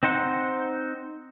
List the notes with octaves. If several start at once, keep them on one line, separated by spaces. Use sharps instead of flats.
C4 D#4 C5 F#5